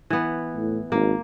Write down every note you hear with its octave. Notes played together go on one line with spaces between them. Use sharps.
E3 B3
A2
G#1 A#3